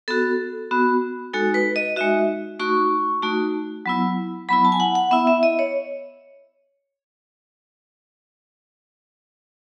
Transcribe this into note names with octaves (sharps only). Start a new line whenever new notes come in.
B3 F#4 A4
B3 F#4
G#3 D#4 F#4 A4
B4
D#5
G#3 D#4 F#4 E5
A3 D#4 F#4 C#6
A3 D#4 F#4
F#3 B3 E4
F#3 B3 E4 B5
A5
G#5
F#5
F#5
B3 E4 E5
E5
D#5
C#5